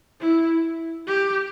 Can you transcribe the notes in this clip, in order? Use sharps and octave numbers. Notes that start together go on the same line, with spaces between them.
E4
G4